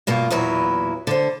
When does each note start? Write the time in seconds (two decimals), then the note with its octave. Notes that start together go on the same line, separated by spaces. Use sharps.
0.07 G2 B2 A#3 F4
0.30 E2 A#2 F#3 E4 B4
1.07 D3 C5